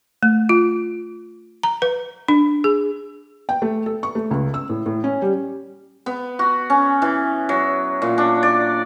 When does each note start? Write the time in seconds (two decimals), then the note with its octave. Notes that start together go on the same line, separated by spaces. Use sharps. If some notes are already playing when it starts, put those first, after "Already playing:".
0.23 A3
0.49 F4
1.63 A#5
1.82 B4
2.28 D4
2.64 G#4
3.49 G5
3.62 A3
3.86 A4
4.03 C#6
4.15 A3
4.31 C#2
4.54 E6
4.69 A2
4.86 A2
5.04 C#4
5.22 G3
6.06 B3
6.39 F#4
6.70 C#4
7.02 E3
7.49 F#3
8.02 A#2
8.18 D4
8.43 D5